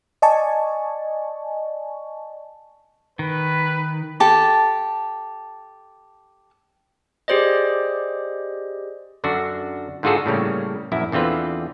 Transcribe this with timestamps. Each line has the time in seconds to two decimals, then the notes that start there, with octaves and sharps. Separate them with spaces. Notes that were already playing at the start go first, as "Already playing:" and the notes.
0.22 D5 D#5 G#5 A5 C#6
3.19 D#3 B4
4.20 G4 A4 A5
7.28 G4 G#4 C5 D5 D#5
9.24 F#2 D3 D4 F#4
10.03 G#2 D3 F4 F#4 G#4 A4
10.26 A2 C#3 G3 A#3
10.92 A#1 F#2 E4
11.12 E2 D3 C4 F4 B4